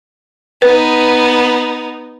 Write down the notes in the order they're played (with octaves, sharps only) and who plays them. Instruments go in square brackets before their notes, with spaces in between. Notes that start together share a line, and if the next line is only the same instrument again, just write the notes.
[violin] B3 D#4 [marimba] B4